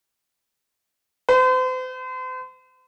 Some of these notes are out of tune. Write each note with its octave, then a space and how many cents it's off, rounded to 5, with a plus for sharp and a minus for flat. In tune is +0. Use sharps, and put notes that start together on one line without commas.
C5 -40